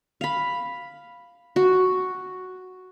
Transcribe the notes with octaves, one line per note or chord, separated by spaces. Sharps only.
F5 B5
F#4